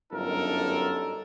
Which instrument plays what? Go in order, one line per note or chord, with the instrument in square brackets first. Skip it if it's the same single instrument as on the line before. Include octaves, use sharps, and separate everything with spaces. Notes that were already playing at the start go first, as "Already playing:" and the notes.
[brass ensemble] G1 F#2 D3 D#4 A4 A#4